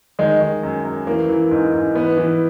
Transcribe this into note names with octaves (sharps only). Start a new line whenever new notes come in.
D#3 G#3
D#3
F#2
F#2
E3 A#3
E3
G#2
G#2
E3 B3
E3